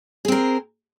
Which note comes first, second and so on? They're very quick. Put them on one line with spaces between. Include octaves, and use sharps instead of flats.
G#4 C4 A#4